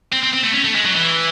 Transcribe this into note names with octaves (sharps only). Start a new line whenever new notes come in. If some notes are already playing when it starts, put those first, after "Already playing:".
C4
C4
C4
A3
C#4
A3
G#3
F#3
E3